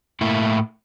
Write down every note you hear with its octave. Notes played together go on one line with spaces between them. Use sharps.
A2 A#3 E4